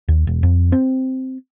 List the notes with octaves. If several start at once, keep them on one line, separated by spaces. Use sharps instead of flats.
D#2
E1
F2
C4